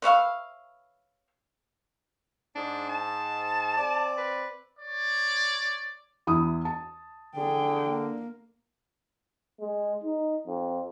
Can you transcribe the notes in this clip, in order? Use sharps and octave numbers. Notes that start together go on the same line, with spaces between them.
B4 C#5 E5 F5
G#2 D4
A5
C4 D5
B4
C#5 D5
E2 E4 D#6
A5
D3 G#4 G5
A#3
G#3
D#4
F2